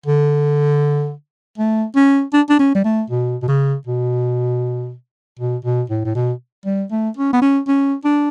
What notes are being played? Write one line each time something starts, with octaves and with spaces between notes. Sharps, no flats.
D3
A3
C#4
D4
D4
C#4
G3
A3
B2
B2
C#3
B2
B2
B2
A2
A2
B2
G3
A3
C#4
B3
C#4
C#4
D4